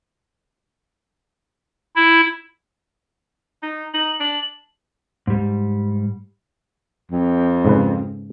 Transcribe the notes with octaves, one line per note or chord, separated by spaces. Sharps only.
E4
D#4
D#4 F#7
D4 F#7
G#2 G3
F2
G#2 C#3 B4